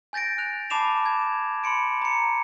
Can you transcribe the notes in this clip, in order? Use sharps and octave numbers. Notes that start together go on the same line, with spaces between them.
G#5 G6 A6 A#6 D7
F#6 F7
A5 B5 D6 C7 E7 F7
G#6
B5 C6 C#7 D7
A#5 C#7